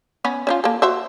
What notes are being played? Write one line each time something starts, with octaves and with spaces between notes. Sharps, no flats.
B3 C#4 B5
C#4 E4 F4
A#3 A4
F#4 C5 E5